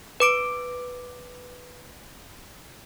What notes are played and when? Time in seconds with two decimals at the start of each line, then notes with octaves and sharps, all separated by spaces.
0.20 B4 D6 D7